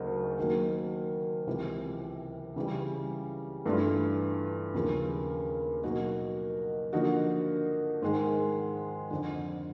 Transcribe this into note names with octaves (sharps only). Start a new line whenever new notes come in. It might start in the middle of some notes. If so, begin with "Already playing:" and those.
Already playing: D2 C#3 F#3 A#3 D#4
D#3 F#3 A#3
C#2 C3 E3
C#3 E3 G3
G2 E3 A3 D4 F4
D#2 C#3 F3 A#3
B2 F#3 A#3 D#4 F#4
D3 F3 A#3 D#4 F#4
G#2 D#3 G#3
F2 D3 F3